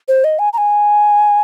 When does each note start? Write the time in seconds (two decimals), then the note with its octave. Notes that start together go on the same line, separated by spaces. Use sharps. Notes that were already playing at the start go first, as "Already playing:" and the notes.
0.08 C5
0.24 D#5
0.39 G#5
0.53 A#5
0.58 G#5